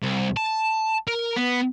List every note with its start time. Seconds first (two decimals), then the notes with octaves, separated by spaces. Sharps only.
0.02 C2
0.37 A5
1.08 A#4
1.36 B3